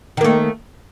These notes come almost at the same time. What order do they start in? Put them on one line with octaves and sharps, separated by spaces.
D#3 A#3 A3